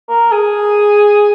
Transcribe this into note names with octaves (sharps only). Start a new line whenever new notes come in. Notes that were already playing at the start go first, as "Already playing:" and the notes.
A#4
G#4